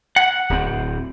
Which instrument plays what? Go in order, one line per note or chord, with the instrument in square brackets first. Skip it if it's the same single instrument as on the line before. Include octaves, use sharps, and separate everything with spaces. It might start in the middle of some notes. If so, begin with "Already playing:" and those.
[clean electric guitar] F#5
[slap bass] D1 C4